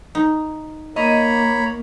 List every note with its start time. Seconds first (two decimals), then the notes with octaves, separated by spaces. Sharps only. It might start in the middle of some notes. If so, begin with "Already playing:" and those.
0.15 D#4
0.96 A#3 C#5 D#5 A#5 B5